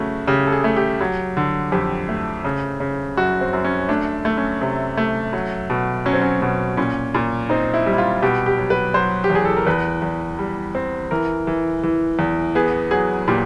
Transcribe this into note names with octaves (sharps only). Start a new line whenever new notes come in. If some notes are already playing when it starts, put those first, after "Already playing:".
Already playing: C#3 A3 F#4
C#3 G4
A4
G#4
A3
G4
F#3
D3
F2 G4
A3
C#3
C#3
F#2 F#4
C4
F#2
C#4
A3 D4
A3
C#4
C3
A3
F#3
B2
F#3 C#4
C4
C#4
B2 C#4
A#2 C#4
A#2
C4 D#4
E4
G3
E4
F4
B2 G4
G4
F#3
B4
F#3 C5
G4
E2
G#4
A4
A#4
E2 B4
E2
G3
C4
E3 A#4
E3
E3
E2
B3 G#4
F#3 G#4
A#2 G4